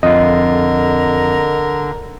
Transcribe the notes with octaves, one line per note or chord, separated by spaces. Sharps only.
F2 D3 F4 A#4 D#5